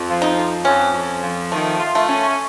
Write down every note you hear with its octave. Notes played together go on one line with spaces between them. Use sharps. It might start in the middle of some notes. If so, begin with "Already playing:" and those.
Already playing: F2
F3
D#4
F2
F2 C#4
F2
F3
D#3 A3
F4
A3
C#4